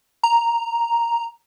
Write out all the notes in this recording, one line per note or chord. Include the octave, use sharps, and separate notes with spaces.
A#5